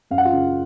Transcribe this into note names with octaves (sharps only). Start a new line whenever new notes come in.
F#2 F5
F#5
F4 F5
C#3